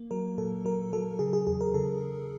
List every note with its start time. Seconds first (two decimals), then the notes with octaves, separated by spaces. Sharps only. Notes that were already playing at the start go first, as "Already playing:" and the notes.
Already playing: A#3
0.11 F#3 A#4
0.38 A#2 A4
0.65 F#3 A#4
0.93 F#3 A4
1.19 C#3 G#4
1.33 G#4
1.47 E2 G#4
1.61 A#4
1.74 C#3 A4